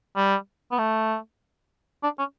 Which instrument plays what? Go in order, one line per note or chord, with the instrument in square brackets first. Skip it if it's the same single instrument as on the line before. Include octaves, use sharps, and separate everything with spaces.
[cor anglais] G3
B3
A3
D4
C#4